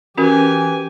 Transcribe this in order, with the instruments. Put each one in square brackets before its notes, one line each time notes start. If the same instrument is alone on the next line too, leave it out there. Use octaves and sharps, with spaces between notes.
[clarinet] E3 [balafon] C#4 F#4 A#4 [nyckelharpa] G4 G#5